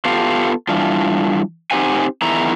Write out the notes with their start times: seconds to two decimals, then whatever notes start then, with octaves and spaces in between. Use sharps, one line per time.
0.05 B3 F4 G4 A4 F5
0.69 E3 G3 D4 F4
1.71 C4 D#4 G4 C5 F#5 G#5
2.22 E2 D#3 E4 A#5